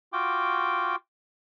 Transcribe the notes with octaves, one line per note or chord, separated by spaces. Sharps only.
F4 F#4 G5 D6